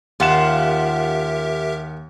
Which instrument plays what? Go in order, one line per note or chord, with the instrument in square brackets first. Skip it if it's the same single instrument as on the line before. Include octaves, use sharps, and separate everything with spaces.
[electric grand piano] D#2 F#5 E7 [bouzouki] F4 [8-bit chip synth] G4 A#4 E5